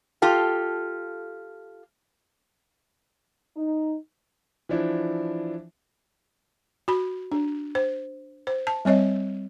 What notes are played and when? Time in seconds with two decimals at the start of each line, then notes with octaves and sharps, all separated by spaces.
0.22 F4 G4 A4 F5
3.57 D#4
4.69 E3 F3 D4 E4
6.88 F#4 B5
7.32 D4
7.75 C5
8.47 C5
8.67 A5
8.85 G3 C4 C#5 D#5